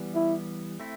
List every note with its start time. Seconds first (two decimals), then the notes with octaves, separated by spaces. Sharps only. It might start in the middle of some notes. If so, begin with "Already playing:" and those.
Already playing: E3 G3 B3
0.14 E4
0.80 A3 C4 E4